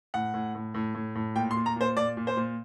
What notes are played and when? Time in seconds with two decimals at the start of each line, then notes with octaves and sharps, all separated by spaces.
0.14 A2 F#5
0.34 A2
0.55 A2
0.74 A2
0.95 A2
1.15 A2
1.35 A#2 G5
1.51 C6
1.56 A#2
1.66 A#5
1.76 A#2 C5
1.96 A#2 D5
2.17 A#2
2.27 C5
2.37 A#2